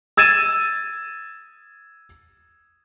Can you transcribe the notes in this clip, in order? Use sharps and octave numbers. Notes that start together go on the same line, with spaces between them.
E6 G#6 A6 D#7 E7